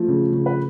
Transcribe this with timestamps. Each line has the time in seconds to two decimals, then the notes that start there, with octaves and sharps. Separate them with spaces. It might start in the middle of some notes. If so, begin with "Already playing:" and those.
Already playing: F3 A3
0.08 C#3
0.32 C#3
0.46 B4